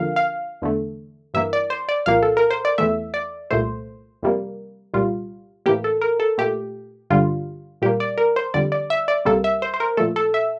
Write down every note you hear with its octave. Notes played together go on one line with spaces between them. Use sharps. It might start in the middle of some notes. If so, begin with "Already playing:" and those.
Already playing: F2 D3 F3 A#3 F5
F5
E2 D3 A3
G2 E3 A#3 E5
D5
C5
D5
C2 A#2 F3 A#3 F5
A4
A#4
C5
D5
E2 E3 A3 E5
D5
C2 A#2 A3 C5
F2 C3 G3 A#3
C2 A#2 G3 F4
A2 E3 A#3 G4
A4
A#4
A4
A#2 A3 G4
G2 D3 G3 F4
A#2 G3 A#3 G4
D5
A#4
C5
F2 D3 G3 D5
D5
E5
D5
C2 C3 G3 A#3 A4
E5
C5
C5
A#4
A#2 F3 A3 A4
A4
E5